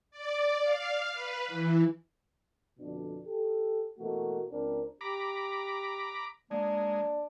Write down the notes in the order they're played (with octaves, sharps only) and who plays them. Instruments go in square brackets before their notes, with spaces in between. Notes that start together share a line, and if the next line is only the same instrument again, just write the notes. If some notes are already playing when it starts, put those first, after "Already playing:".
[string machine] D5
F5
B4
E3
[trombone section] F2 B2 D3 D4
G4 A4
B2 E3 A3 A#3 F#4
C#2 C4 D4 A#4
[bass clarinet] G4 [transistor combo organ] A#5 B5 D6
[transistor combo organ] G#3 [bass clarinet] A#3 [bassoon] D4